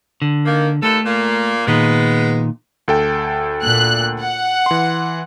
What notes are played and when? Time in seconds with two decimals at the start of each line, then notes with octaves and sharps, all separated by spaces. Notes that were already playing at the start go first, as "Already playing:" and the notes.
0.22 D3
0.46 D#3 A#3
0.83 D#2 A3 A4
1.06 A#2 A#3
1.67 A#2 D#3 G#3 B3
2.88 D2 A4 G5
3.62 A#2 F#6
4.21 F#5
4.66 E3 C6